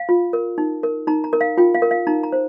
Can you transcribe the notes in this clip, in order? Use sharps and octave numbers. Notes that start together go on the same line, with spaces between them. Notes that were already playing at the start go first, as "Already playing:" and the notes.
Already playing: F5
F4
A#4
D#4
A#4
D#4 A#5
A#5
A#4
F5
F4 G5
F5
A#4
F5
D#4 A#5
A#5
C5